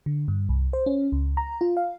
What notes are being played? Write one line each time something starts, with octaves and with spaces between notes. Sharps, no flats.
D3
G2
C2
C5
C#4
C#2
A#5
F4
F5